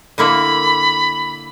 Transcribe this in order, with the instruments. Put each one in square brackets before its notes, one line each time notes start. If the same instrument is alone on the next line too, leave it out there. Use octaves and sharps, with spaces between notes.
[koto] D3 A#3 E4 [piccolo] B5